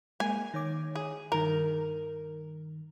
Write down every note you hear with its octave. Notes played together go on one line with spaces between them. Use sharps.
G#3 A#3 G#5
D#3 C#5 D6
G#4
G2 D#3 A#4